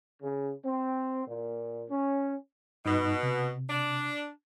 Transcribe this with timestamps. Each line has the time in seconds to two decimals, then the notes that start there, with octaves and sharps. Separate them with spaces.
0.22 C#3
0.65 C4
1.26 A#2
1.89 C#4
2.85 G2 B2 D#4
3.23 C3
3.69 D4